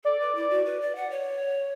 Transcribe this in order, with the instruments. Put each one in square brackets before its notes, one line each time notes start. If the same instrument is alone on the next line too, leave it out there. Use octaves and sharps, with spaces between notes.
[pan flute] A4 [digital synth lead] D5
[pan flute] B4
E4
F#4
B4
D5
F#5
C#5